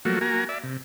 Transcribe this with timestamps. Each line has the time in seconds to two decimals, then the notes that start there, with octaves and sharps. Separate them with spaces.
0.05 F3 F#3 A3 A#3 F#4
0.21 A#3 F#4 G#5 A#5
0.49 D5 E5
0.64 C3